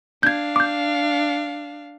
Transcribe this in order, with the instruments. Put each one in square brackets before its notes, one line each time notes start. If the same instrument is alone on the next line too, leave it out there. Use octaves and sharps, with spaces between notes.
[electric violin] D4 F5 [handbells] G6 G#6
[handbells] D6 G6